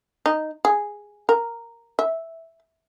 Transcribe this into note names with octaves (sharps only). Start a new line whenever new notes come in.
D#4
G#4
A#4
E5